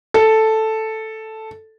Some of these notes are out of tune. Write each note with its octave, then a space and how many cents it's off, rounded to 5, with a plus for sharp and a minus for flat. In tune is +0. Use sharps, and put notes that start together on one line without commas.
A4 +0